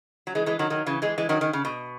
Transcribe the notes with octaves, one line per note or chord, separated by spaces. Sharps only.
F#3
E3 G#3
E3 G#3
D#3 F#3
D#3 F#3
C#3 E3
E3 G#3
E3 G#3
D#3 F#3
D#3
C#3
B2